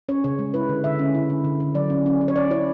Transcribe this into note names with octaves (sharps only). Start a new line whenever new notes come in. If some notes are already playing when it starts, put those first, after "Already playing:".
C#4 C#5
C#3 C#5
G#3
E4 B4
D3
D3 E5
C#4
E4
D3
D3
D3
F#3 D5
C#4
C#4
C#4
C#5
C#4 D5
E4 C#5